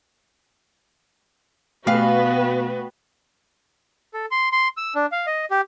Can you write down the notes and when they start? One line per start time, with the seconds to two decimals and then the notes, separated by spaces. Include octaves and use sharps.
1.87 B2 A3 B3 F#4 B4 F5 G5
4.14 A4
4.31 C6
4.52 C6
4.77 E6
4.95 D4
5.12 F5
5.27 D#5
5.51 G4